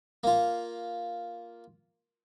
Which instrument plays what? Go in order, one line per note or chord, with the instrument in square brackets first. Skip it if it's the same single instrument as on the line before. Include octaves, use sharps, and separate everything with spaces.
[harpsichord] A#3 F4